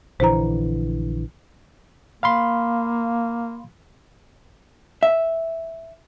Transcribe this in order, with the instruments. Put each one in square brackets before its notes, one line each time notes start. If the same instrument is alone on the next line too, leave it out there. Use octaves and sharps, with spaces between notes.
[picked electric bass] A#1 D3 E3 [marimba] C5 A#5
[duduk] A#3 [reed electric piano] F5 B5 C6
[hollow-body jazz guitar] E5